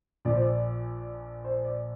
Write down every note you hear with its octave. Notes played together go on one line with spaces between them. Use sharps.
A#1 A#2 F3 D5
C5
D5
C5
D5